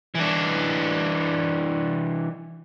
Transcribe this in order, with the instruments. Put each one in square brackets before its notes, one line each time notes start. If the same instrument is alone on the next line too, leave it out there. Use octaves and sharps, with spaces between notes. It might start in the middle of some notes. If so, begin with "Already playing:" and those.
[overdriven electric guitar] E3 D4